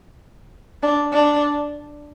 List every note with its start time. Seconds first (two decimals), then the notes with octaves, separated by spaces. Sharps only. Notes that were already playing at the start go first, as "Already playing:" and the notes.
0.83 D4
1.13 D4